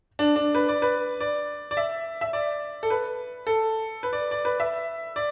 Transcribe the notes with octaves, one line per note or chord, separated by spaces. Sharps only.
D4
D4
B4
D5
B4
D5
D5
E5
E5
D5
A4
B4
A4
B4
D5
D5
B4
E5
D5